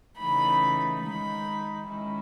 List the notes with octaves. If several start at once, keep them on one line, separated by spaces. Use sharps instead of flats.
C#3 E3 A3 D#4 B5
D#3 G#3 D#4 B5
D#3 G#3 C#4 E4